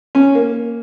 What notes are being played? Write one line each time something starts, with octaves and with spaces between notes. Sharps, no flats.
C#4
A#3